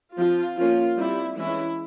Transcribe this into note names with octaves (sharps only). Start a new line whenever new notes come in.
F3 C4 F4
F3 A#3 C#4 F4
G3 C4 E4
E3 G#3 C#4 E4